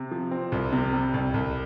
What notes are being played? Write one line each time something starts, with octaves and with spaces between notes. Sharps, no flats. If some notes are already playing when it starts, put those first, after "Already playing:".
Already playing: C3
F3
C4
C2
C3
G3
C2
C2